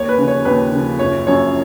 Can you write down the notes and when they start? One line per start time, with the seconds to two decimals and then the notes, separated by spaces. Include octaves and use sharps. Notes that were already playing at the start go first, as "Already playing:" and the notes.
Already playing: D#2 C#5
0.09 B4
0.18 C#3 F3
0.28 C#5
0.45 D#2 B4
0.72 C#3 F3
0.99 F#1 C#5
1.26 F#2 F3 C#5